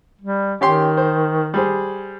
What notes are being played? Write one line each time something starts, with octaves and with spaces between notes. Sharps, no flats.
G3
D#3 C#4 G4 C6
C5
G3 G#4 C5